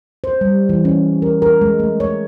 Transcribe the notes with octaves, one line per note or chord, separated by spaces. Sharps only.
C5
G3
E3
C#4
A#4
A#4
G#3
A3
C#5